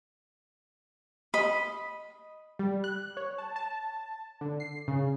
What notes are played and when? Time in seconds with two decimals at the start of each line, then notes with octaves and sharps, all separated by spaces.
1.34 D#5 B5
2.59 G3
2.84 F#6
3.17 C#5
3.38 A5
3.56 A5
4.41 D3
4.60 C7
4.88 C#3